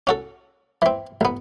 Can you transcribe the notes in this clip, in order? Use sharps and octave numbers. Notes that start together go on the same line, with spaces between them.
C#4 F#4 A4
E3 C4
A1 B3